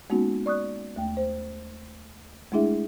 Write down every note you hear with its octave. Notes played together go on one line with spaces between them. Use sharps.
G#3 A#3 B3 C#4 D#4 F#4
D5 C#6 D#6 F#6
D#2 A3 G5
C5
G#3 A3 D4 E4 G#4 E5